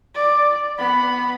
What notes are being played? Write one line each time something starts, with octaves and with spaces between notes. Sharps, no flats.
D5
B3 B5